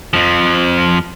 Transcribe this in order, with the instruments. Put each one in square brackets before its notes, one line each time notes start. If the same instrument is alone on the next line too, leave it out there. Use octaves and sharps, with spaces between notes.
[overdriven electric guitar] F2 F3